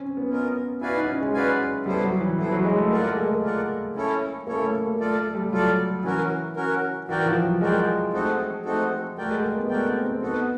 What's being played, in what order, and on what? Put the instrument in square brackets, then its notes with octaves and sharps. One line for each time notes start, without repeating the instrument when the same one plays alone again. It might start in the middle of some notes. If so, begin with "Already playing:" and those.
Already playing: [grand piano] C4 C#4
B3
[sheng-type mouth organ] C#4 F4 A#4 D#5
[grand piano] E4 [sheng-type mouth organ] F#4 B4 D5 F5 G#5
[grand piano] D#4
C#4
G#3
[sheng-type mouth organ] F#4 B4 D5 F5 G#5
[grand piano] G3 [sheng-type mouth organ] B3 E4 A4 C5
[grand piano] F#3
E3
[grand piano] E3 [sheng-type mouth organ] B3 E4 A4 C5
[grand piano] F#3
G#3
A3
[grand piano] A#3 [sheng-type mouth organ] F4 A#4 D5 F#5
[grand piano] A3
G#3
A#3
[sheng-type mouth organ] F4 A#4 D5 F#5
C#4 E4 A4 C#5
[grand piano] A#3 [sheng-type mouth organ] C#4 E4 A4 C#5
[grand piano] A3
A#3
[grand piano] A3 [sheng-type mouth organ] F4 A4 D5
[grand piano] A3
G3
[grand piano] F#3 [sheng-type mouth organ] F4 A4 D5
[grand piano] E3 [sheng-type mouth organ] C#4 F#4 A#4
[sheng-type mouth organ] C#4 F#4 A#4
[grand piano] E3 [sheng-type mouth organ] F#4 A#4 D5 G5
[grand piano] F3
F#3
[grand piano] G#3 [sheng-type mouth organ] F#4 A#4 D5 G5
[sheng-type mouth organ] A3 C4 D#4 F#4 A4
A3 C4 D#4 F#4 A4
[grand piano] A3 [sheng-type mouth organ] F#4 A#4 D5 G5
[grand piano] G#3
A#3
B3
G#3
[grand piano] A3 [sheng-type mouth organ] F#4 A#4 D5 G5
[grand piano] C4
C4
[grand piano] B3 [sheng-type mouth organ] D#4 F#4 A4